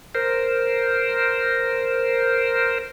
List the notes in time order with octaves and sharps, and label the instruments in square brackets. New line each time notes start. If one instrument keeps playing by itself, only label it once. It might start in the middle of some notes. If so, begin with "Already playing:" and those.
[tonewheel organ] A#4 C5